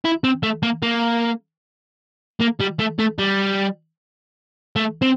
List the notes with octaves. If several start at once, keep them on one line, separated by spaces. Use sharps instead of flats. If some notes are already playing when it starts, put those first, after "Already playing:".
E4
C4
A3
A#3
A#3
A#3
G3
A3
A3
G3
A3
C4